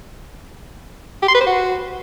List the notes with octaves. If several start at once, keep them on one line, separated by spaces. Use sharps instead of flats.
G4
C6
B4
C5
F#4